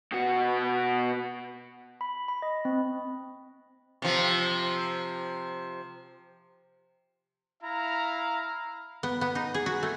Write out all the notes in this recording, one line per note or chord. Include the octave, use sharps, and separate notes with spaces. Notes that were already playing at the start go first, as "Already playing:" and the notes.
B2 F#4
B5
B5
D#5
C4
C3 F3
E4 F5 A#5
B3
B3
D#4
G#4
F#4
A3